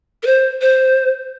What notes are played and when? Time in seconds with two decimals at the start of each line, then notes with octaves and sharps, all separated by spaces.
0.23 A#4
0.27 C5
0.61 C5